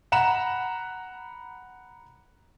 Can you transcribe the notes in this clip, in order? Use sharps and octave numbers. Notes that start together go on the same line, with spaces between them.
F#5 A#5 B5 E7